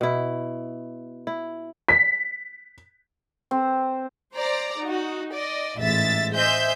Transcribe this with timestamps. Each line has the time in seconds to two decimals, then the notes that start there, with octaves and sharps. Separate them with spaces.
0.01 B2 E4
1.27 E4
1.89 B6
3.51 C4
4.35 C5 D5 A#5
4.82 D#4 F#4
5.34 D5 D#5
5.78 A1 G#2 G#3 E5 A6 B6
6.34 C5 D#5 E5 G#5 G6